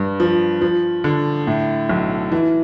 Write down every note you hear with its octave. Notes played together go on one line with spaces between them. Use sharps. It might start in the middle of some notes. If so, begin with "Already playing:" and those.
Already playing: G2
F3
F3
D3
A2
B1
E3